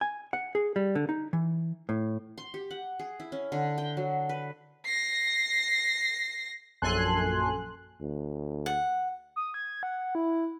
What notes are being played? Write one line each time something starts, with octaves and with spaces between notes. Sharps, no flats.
G#5
F#5
G#4
G3
D3
D#4
E3
A2
C6
G4
F#5
G#4
E4
C#4
D3
G5
F#3
B4
A#6 C7
A#1 F#2 A4 G#5 C6 F#6
D2
F#5
D#6
G#6
F#5
E4